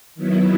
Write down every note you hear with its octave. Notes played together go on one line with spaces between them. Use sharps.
D#3 F#3 B3 E4